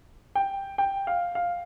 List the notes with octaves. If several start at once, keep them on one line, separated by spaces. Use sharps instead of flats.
G5
G5
F5
F5